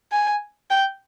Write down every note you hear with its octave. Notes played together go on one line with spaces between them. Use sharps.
G#5
G5